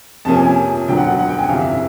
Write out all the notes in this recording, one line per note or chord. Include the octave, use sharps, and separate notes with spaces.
F2 C3 F3 A#3 C#4 A5
G#5
G#5
E1 D2 D3 F#3 G5
F#5
F#5
F#5
G5
G#5
G1 F2 C3 E3 F5
E5